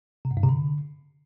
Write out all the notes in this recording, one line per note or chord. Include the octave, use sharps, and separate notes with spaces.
C3
G#2
G2
C3
D3